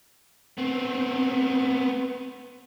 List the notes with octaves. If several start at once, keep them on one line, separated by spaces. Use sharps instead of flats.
B3 C4